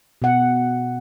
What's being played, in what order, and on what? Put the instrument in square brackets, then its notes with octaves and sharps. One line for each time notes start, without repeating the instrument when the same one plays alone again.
[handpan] B2 F#5